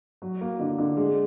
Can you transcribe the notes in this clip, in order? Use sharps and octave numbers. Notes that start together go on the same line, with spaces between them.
F#3
A#3
D3
D3
G#3